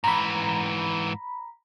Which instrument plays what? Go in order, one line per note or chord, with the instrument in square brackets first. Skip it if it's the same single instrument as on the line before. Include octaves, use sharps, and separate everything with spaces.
[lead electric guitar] G#2 E3 [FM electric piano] A#5 B5